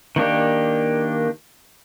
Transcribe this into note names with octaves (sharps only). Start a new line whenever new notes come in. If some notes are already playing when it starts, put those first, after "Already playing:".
D#3 A#3 D4 G4